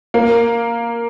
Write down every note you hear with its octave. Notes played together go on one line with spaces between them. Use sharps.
A#3